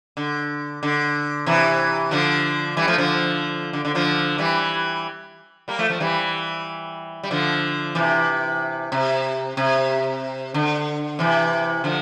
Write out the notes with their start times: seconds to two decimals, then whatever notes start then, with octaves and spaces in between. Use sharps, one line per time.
0.17 D3
0.83 D3
1.46 C3 E3
2.11 D3 F3
2.77 E3 G3
2.87 F3 A3
2.98 D3 F3
3.73 D3
3.85 D3
3.95 D3 F3
4.38 E3 G3
5.68 G3 A#3
5.79 F3 A3
5.90 F3 A3
6.00 E3 G3
7.23 G3
7.31 D3 F3
7.95 C3 E3
8.92 C3
9.57 C3
10.54 D3
11.19 C3 E3
11.84 D3 F3